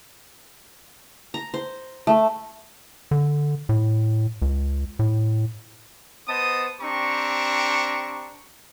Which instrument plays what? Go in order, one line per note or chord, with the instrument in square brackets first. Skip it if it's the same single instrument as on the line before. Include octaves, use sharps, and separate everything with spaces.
[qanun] A#5
C5
A3
[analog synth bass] D3
A2
C#2
A2
[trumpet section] B3 C5 D#5 A5 D#6
C4 D4 G4 A#5 C#6